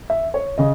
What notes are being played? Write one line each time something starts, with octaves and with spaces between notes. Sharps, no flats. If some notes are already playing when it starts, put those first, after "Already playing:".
E5
C#5
C#3 D#5